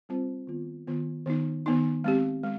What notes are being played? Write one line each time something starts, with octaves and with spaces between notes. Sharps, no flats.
G3 C4 F4 C5
D#3 B3 F4
D#3 B3 F4
D#3 B3 D#4
D#3 B3 D#4
G#3 C4 G4
G#3